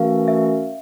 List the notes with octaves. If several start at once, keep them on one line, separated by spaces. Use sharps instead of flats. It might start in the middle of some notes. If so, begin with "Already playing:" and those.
Already playing: E3 A3 C#4 F#4 A#4 F5
E5